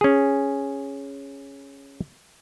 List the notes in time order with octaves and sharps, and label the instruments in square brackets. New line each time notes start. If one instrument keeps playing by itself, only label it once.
[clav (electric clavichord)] C#4 G#4